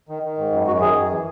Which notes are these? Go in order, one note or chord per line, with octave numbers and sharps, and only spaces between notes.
D#3
D#3
G#2
F#2
F#2 F#4
D#3 G#4
F#2
E3